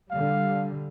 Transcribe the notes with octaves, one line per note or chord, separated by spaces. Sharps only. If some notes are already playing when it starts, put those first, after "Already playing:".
D3 G3 F5